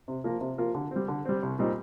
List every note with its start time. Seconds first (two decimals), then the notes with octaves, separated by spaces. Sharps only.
0.08 C3
0.24 F3 A#3 F4 A#4
0.41 C3
0.58 F3 A#3 F4 A#4
0.75 D3
0.91 G3 C4
1.08 D3
1.25 G3 C4
1.43 C2
1.59 A#2 G3 C4 D#4